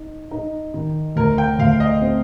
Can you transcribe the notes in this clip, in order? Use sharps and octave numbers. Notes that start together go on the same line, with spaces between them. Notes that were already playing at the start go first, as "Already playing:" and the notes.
Already playing: D#4
D#4
D#3
D2 A#4
G5
D2 F5
D#5
C4